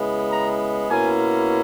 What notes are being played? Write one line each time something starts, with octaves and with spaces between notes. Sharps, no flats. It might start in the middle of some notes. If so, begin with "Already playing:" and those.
Already playing: C#3 G#3 B3 E4
A#5
B2 A#3 C#4 E4 G#5